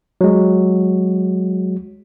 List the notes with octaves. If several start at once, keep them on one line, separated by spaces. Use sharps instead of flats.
F#3 G#3